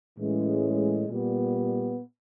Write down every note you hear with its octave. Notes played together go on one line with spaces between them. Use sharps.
A2 E3 G#3 C#4
A#2 G3 B3